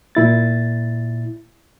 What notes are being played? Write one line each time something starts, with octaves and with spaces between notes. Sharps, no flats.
A#2 E4 A6